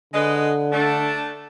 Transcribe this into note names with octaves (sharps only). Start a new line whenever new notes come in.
D3 G#3 B4 D#5
A3 D4